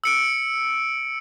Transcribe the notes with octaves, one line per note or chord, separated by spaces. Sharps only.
E6 C#7 D7